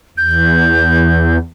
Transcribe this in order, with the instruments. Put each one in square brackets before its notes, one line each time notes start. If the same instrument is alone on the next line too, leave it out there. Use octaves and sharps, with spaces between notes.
[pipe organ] E2 [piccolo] G6